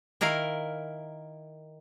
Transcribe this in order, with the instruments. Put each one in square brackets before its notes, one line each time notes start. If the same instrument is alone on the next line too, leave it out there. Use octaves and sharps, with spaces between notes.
[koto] D#3 E4 A#4 F5